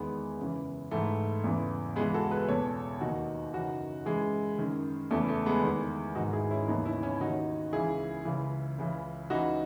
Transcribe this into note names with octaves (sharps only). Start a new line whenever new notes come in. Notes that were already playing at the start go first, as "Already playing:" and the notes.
Already playing: E2 D#3 G#3 B3
F#2 C#3 E3
G#2 E3 A3
E2 C#3 E3
C#2 C#3 E3 G#3 B3
F#4 A4
G#4 B4
E2 B2 A4 C#5
D#2 D#3 D#4 F#4
F#2 C#3 E3 D#4 F#4
F#2 E3 G#3
F#2 D#3
E2 C#3 E3 A3
A3
G#3 B3
E2 D#3
G#2 D#3 D#4 F#4
E4 G#4
C#4 E4
D#2 C#3 E3 B3 D#4
C#4 E4
C#4 E4
D#2 D#3 D#4 F#4
C#2 C#3 E3 E4 G#4
C#2 C#3 E3
C#2 C#3 E3
C#2 C#3 E3 D#4 F#4